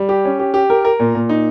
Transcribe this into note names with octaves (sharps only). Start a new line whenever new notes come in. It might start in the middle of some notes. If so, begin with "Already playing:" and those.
Already playing: G3
G4
C#4
G4
G4
A#4
A#4
A#2
A#2
D#4